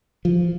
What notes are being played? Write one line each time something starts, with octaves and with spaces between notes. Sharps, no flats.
F3